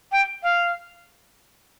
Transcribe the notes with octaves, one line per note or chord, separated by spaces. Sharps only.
G5
F5